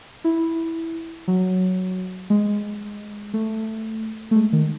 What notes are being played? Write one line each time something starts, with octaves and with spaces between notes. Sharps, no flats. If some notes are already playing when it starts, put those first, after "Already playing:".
E4
F#3
G#3
A3
A3
G#3
D#3